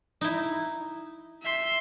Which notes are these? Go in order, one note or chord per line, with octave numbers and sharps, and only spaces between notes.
D#4 E4
E5 C6